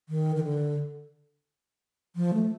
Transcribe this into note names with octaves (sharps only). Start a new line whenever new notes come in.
D#3
D#3
D3
F3
A3